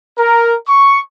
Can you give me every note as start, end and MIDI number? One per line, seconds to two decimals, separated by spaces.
0.18 0.55 70
0.68 0.99 85